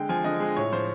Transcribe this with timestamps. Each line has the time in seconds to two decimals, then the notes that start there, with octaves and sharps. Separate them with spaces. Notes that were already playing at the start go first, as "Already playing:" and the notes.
Already playing: D3 G#3 G5
0.09 F3 G#5
0.24 D3 D#5
0.40 G#3
0.57 A2 C#5
0.72 F3 C5